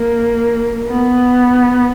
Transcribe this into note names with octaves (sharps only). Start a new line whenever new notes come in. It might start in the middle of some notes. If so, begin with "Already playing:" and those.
Already playing: A#3
B3